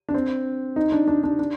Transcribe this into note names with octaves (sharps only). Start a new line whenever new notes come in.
D4
C4
D#4
D4
D4
D4
D4